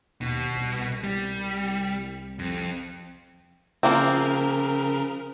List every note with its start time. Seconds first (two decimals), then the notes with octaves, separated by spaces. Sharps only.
0.21 D#2 B2
0.55 C2
1.04 G3
2.39 F2
3.83 C#3 F3 A#3 C4 A#4